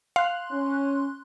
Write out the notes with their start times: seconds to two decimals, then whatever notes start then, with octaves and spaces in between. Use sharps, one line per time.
0.16 F5 C6 F#6
0.51 C#4